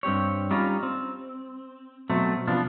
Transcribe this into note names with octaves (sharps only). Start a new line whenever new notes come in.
G2 C4 G4 C#5
G3 C#4 D#4 F4
C4
B2 F#3 A3 C4
C3 F3 B3 D4 F4